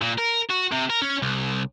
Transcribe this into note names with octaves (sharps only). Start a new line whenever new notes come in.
A#2
A#4
F#4
C3
A#4
C#4
C2